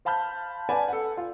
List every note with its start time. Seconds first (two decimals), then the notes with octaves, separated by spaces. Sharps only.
0.05 C5 F5 A5 B5 F6 G6
0.69 B4 D5 F#5 G#5 A5 B5
0.88 A4 F#5
1.17 F4